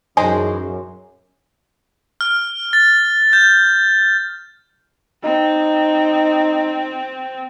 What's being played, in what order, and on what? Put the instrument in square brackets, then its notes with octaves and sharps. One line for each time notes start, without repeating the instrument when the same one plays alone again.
[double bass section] F#2 [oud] E3 G#3 G#4 [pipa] D#4 C5 [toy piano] G#5
[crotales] F6
A6
G6
[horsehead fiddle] C4 [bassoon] D#4